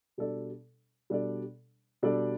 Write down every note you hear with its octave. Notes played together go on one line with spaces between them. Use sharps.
B2 G3 D4 A4 D5
B2 G3 D4 A4 D5
B2 G3 D4 A4 D5